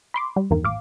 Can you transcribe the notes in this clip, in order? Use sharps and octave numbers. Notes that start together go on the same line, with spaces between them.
B5 C6 D6
G3
E2 G2 D#3 A#3
A1 F5 D6